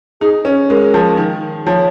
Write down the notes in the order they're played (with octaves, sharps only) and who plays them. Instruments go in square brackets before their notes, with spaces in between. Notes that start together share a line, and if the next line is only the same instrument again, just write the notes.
[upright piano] D#4 [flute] G#4
[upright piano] C#4 [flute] C#5
[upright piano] G#3 [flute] A#4
[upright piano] F3
D#3
[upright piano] F3 [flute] C#5